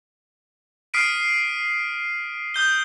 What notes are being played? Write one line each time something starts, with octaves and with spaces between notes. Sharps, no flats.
D#6 F6 B6 C7 D7 D#7
D#6 G6 G7